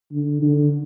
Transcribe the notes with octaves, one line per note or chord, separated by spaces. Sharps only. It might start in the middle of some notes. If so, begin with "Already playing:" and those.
D3
D3